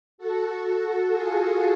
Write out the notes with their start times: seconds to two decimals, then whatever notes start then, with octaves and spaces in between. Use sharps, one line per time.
0.18 F#4 A4
1.11 F4 G#4